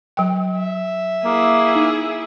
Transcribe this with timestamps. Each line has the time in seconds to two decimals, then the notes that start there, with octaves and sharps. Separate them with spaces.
0.17 F#3 G5
0.58 E5
1.25 A#3 E4 G#4
1.75 D#4